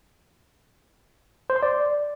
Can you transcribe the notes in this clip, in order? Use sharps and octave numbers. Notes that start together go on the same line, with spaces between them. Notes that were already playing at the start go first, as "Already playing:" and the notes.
C5
C6
D5